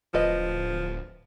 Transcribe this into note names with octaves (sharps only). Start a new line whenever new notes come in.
D1 F3 A4 B4 D#5